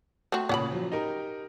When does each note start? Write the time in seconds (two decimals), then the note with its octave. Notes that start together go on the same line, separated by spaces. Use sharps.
0.32 A3 C4 F#4
0.49 A#2 C#3 C#4 F#5 B5
0.71 F3 F#3
0.92 D#4 G4 A#4